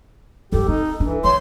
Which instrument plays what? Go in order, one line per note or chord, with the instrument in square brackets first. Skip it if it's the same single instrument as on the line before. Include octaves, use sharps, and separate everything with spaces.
[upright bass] G2 F3 [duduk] G4 [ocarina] A4
[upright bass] C4 [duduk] D#4
[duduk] E3 [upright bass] D4
[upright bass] F3 [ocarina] C#5 [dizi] C6